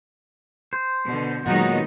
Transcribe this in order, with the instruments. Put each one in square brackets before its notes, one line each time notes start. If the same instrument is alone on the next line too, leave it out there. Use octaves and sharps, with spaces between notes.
[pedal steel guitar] C5
[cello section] B2 D3
[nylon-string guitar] A#2 F#3 G#3 [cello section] D#3 B3 D#4 [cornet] F#5